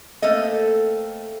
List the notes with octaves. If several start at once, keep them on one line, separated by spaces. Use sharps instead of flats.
A3 A#3 C4 A4 D#5